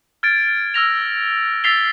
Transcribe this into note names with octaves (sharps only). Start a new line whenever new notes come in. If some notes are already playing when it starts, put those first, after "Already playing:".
F6 G#6 A6 D7
E6 F6 A#6 F7
E6 A6 B6 C7 F7 G7
G7